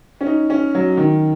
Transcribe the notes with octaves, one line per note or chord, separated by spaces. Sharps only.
C#4
D#4
C#4
F#3
D#3